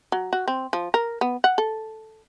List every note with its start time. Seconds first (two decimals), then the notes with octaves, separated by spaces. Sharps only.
0.12 F#3
0.33 F#4
0.48 C4
0.73 F3
0.94 A#4
1.21 B3
1.44 F#5
1.58 A4